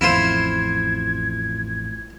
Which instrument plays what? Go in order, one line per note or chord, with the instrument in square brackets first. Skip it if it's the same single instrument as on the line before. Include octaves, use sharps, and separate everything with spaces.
[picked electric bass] A1 F2 [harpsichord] E4 F4 C5 [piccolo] G#6